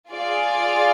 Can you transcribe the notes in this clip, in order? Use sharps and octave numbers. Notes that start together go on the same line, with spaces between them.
F4 G#4 D5 F5